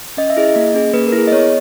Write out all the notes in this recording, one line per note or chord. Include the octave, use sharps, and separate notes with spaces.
C#4 D#5
E5
E4 G#4 D#5
A#3
C#4 G#4
A#3 B4
A#4
E4
G#4
D#5
B3 C#5